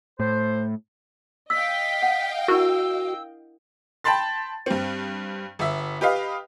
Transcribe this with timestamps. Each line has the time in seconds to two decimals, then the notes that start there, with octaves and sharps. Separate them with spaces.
0.20 A2 C5
1.50 D#5 F5 G5 E6 B6
2.02 F#5
2.48 D4 E4 F#4 A#4 E6
4.04 G5 A5 B5 C6 A6
4.66 G2 C4
5.59 G1 E5
6.01 G4 B4 D#5 F5